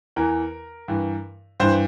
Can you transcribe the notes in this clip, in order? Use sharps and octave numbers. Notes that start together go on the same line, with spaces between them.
E2 E3 A#4
G2 E3
G2 E3 C5